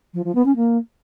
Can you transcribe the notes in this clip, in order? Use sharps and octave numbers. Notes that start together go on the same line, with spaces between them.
F3
F3
B3
C#4
A#3